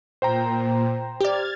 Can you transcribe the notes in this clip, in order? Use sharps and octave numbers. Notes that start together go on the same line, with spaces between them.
A#2 C5 G5 A#5
G4 D5 F6 G#6 A6